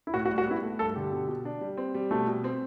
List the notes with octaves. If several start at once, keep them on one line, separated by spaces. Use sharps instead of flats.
E4
A2 F#4
F#4
G3
F#4
B3 E4
A3
G2 A4
D3 G4
B2
B2
D4
G3
C4
G3
B2 A3
B2
C4